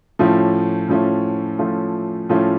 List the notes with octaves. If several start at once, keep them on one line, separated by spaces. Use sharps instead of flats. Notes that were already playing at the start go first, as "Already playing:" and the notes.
A2 F3 A3 C#4 F4
A2 F3 A3 C#4 F4
A2 F3 A3 C#4 F4
A2 F3 A3 C#4 F4